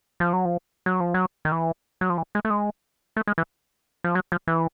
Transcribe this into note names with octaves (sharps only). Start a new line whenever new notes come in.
F3
F#3
F3
F#3
F3
F#3
D#3
E3
F#3
F3
E3
G#3
A3
G#3
A3
G#3
E3
F3
F#3
F3
E3